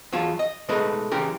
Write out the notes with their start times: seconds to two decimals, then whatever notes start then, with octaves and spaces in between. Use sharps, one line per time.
0.13 E2 F#3 F4 A5
0.39 D#5
0.69 B2 G#3 A3 D#4 A#4 B4
1.11 F#2 C#3 E3 G4 A#4